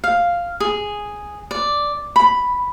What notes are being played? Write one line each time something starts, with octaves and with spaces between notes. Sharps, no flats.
F5
G#4
D5
B5